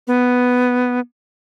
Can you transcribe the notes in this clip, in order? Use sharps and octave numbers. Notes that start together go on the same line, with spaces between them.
B3